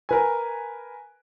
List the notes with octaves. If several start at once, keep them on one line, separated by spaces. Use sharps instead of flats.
A#4 B4 G#5